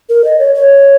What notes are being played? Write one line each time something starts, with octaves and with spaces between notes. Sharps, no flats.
A#4
D#5
C#5
C#5